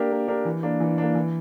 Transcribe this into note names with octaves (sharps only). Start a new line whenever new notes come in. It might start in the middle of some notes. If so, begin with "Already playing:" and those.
Already playing: A#3 D4 G4 A#4
A#3
D4 G4 A#4
E3
A#3 D4
E3
A#3 D4
E3